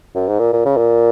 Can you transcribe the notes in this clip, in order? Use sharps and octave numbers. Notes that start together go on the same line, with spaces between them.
F#2
G#2
A#2
A#2
C#3
A#2